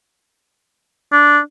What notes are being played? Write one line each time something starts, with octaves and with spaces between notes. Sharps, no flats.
D4